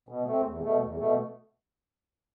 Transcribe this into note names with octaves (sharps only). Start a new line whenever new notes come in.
B2
A3 C4
E2
B2 A3
E2
B2 A3